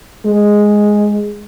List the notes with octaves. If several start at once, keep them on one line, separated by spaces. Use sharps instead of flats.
G#3